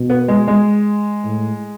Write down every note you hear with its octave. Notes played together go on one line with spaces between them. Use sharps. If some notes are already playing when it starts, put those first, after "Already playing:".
Already playing: B2
B3
G#3
G#3
A2